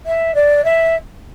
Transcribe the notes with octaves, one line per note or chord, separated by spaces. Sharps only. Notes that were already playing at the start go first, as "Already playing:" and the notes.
E5
D5
E5